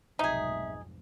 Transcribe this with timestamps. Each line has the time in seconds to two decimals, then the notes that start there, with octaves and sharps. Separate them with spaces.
0.19 F1 B1 G#2 D#4 G#4 E5